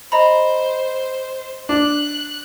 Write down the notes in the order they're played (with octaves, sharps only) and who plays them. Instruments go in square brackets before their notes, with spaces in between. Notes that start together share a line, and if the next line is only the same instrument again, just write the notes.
[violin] C5 [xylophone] D#5 A#5 B5
[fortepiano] D4 [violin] F#6